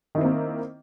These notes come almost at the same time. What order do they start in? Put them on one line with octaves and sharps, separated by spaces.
D#3 E4 C4 A#3